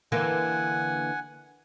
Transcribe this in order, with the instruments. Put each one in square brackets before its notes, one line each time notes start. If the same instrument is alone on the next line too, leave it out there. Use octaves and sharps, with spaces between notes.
[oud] D3 E3 A#3 [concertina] F#5 G#5